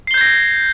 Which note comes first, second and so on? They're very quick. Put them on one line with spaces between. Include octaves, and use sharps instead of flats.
C7 G7 G6 G#6 A#6